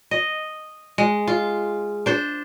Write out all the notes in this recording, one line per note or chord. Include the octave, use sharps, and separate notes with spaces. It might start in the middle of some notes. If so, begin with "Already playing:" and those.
D#5
G#3
F4
D4 C5